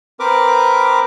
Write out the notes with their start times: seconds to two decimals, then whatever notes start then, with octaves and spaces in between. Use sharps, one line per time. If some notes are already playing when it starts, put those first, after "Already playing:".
0.20 C4 A#4 B4 D6